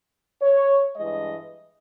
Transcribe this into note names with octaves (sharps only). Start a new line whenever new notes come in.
C#5
G2 E3 G#3 D#5